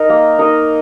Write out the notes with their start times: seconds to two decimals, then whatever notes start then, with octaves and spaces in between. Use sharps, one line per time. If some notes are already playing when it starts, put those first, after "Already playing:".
Already playing: D#4 A#4 D#5
0.10 A#3
0.39 D#4 A#4 D#5